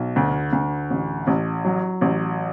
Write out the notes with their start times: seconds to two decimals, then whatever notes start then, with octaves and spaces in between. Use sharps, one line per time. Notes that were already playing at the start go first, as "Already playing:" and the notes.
Already playing: B1
0.16 D2
0.53 D2
0.90 A1
1.27 A1
1.65 F#3
2.01 A1